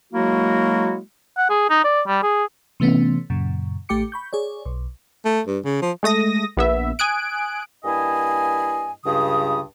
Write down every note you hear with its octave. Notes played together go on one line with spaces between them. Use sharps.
F#3 G#3 A#3 E4 F#4
F#5
G#4
D#4
D5
G3
G#4
C3 E3 A3 B3 C#4
F#2 A#2 C#3
A1 A3 G4 G5 D6 C#7
B5 C#6 G6
G#4 C#5 D5
B1
A3
G2
C#3
F3
G#3 A3 D#6 A#6
A#1 B3 E5
G#5 D#6 F#6 D7
G2 A#3 E4 D#5 G#5
C#2 G2 C#3 D#6